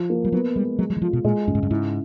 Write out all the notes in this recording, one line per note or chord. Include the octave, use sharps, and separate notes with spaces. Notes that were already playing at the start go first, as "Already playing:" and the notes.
Already playing: F3
A#3
G3
F#3 B3
G3 G#3
F#3 G#3
F#3
E3
F3 F4
B2
A#2 G#3
G2 C#3
G#2
G2
G#2 E4